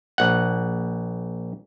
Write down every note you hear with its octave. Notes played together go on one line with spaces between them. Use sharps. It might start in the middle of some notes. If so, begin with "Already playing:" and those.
A#1 F#5